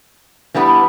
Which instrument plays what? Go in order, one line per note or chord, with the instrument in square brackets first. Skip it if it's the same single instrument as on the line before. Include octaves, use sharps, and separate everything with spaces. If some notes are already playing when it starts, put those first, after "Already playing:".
[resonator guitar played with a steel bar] E3 G3 B3 D4